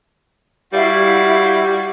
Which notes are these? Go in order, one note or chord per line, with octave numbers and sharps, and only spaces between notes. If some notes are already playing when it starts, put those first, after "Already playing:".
G3 E4 F#4 F5